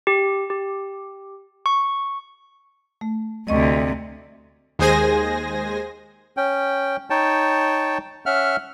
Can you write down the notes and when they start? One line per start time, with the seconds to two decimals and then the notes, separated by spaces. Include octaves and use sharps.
0.07 G4
0.50 G4
1.66 C#6
3.01 A3
3.48 D2 C3 D#5 C#6
4.79 D#2 G#3 G#4 C5 G#5 A#6
6.37 C#4 G5
7.10 D#4 C#5 G5 A5
8.26 C#4 E5 F#5 F6